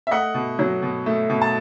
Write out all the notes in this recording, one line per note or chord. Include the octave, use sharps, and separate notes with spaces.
E5
A3 D#5 F#5
B2
F#3
B2
A3
B2
A5